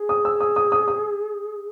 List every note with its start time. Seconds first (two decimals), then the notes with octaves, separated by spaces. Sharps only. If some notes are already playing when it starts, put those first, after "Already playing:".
Already playing: G#4
0.09 D#6
0.25 E6
0.40 D#6
0.56 D#6
0.72 D#6
0.88 D#6